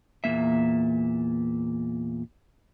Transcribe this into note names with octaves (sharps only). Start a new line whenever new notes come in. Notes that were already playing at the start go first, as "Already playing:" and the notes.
E2 A#2 A#3 E5